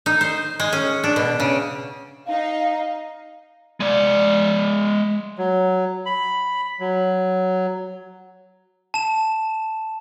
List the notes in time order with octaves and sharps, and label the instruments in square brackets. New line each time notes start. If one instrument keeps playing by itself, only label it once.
[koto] D#4
C5
G#3
C#4
D4
B2
C#3
[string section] D#4 [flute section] F5
[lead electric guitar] G#3 D5
[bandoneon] F#3
B5
F#3
[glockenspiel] A5 E7